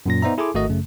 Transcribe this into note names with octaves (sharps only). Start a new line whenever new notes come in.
F#2 A#2 A#6
B3 D#4 C5 D5 E5 A#5
E4 G#4 A4 G#5 C6 D6
G#1 A3 F#4 A#4 D#5
F#2 C#3 A3